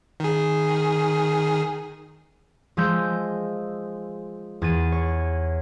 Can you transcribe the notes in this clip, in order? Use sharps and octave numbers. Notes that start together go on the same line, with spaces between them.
D#3 G#4
F3 G#3 D#5 E6 G6
E2 A6 D#7
C#5